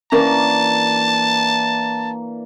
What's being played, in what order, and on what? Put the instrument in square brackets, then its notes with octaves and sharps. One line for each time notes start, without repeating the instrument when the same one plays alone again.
[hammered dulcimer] E3 A#3 D4 [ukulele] C#4 A#4 [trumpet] A5